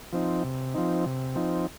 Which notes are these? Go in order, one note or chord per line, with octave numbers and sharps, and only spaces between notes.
F3 C4 D#4
C3
F3 C4 D#4
C3
F3 C4 D#4